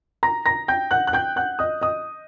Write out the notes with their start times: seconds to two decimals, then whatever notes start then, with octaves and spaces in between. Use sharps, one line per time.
0.23 A#5 A#6
0.46 A#5 A#6
0.68 G5 G6
0.91 F#5 F#6
1.07 F#6
1.13 G5 G6
1.36 F#5 F#6
1.59 D#5 D#6
1.81 D#5 D#6